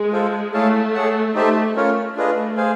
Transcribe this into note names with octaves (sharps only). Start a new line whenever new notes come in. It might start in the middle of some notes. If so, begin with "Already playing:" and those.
Already playing: G#3
F4 A4 C5
A3 E4 G#4 C#5 F5 A5
G#4 C#5 F#5 A5
A3 D#4 G4 C5 E5 A5
A3 C#4 F4 A#4 C#5
D4 F4 G#4 B4 D#5
G#4 C5 F5 G#5